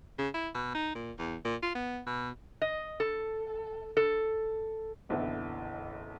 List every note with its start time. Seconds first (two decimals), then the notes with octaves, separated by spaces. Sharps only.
0.19 C#3
0.34 E4
0.55 B2
0.75 D#4
0.95 A#2
1.18 E2
1.45 A#2
1.63 F4
1.75 B3
2.06 B2
2.62 D#5
3.00 A4
3.97 A4
5.09 F#1 B1 D3 E3 B3 E4